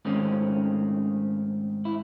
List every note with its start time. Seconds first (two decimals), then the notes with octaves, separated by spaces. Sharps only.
0.05 G#2 D#3 A3 C4 C#4
1.85 E4